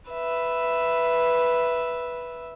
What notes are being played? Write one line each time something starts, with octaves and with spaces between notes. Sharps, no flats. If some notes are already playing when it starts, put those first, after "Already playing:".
B4 E5